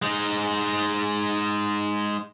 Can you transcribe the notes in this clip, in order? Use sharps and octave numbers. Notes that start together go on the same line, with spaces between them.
G#3 D#4